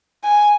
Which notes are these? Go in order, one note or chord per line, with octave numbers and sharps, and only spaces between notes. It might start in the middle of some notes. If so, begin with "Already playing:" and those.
G#5